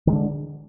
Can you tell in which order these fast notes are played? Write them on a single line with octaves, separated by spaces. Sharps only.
D#3 G#3 D3 D4